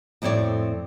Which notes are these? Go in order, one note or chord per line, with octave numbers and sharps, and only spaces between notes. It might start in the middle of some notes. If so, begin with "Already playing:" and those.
F2 A2 C4 C#5 D5